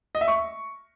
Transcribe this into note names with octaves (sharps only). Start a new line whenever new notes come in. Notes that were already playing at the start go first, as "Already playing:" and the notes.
D#5
E5
C#6